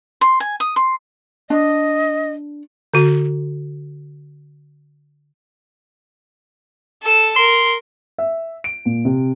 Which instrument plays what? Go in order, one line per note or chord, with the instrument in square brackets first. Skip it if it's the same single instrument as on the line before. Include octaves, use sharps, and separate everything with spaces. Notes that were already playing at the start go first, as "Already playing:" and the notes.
[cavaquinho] C6
G#5
D#6
C6
[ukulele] D4 [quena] D#5
[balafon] D3 F#4
[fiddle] A4 E6
[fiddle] A#4 [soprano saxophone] C6
[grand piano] E5
D7
A#2
C3